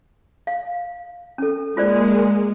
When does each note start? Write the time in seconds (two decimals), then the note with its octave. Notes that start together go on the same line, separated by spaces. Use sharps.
0.47 F5
1.38 C#4 A4
1.77 G#3 A#3 F4 C5 D5